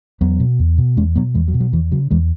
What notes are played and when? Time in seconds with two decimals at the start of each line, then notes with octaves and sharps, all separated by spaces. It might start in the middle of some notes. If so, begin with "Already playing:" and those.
0.21 E2 F#3 B3
0.40 B2
0.59 E2
0.78 B2
0.97 E2 G#3 C#4
1.16 B2 F#3 B3
1.34 E2 E3 G#3
1.48 F#3
1.54 B2
1.60 F#3
1.73 E2 E3
1.92 C#3 F#3
2.11 E2 E3 G#3